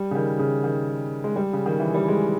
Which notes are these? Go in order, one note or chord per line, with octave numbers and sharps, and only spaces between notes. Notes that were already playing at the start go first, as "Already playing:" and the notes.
Already playing: G3
C#3
D#3
C#3
D#3
G#3
G3
C#3
D#3
E3
G3
G#3